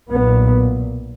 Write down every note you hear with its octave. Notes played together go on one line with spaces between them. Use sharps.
B1 A#2 B3